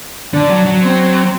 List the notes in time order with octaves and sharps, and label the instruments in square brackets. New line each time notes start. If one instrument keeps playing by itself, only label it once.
[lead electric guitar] D3 [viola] D4
[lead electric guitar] F#3
F#3
[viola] C4